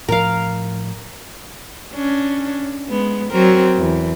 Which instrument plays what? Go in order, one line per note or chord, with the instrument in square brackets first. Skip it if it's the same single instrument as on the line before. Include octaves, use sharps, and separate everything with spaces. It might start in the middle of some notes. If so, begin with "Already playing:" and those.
[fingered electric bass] A2 F3 [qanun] A#4 F5
[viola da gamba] C#4 D4
G#3 B3
F#3 C4 A#4
E2